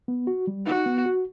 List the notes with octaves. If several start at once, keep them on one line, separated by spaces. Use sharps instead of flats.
B3
F#4
G3
D#4 F#4
B3
F#4